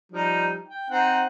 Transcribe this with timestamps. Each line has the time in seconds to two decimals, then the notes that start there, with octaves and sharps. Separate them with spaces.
0.12 F3 G3 D#4
0.68 G5
0.90 C4 D#4 F#5